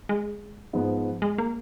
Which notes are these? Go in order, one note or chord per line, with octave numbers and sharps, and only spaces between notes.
G#3
G#2 F3 B3
G#3
A#3